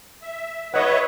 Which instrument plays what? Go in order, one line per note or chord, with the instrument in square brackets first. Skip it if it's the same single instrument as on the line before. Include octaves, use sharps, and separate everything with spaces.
[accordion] E5
[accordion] B4 C#5 E5 [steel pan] D#5 F#5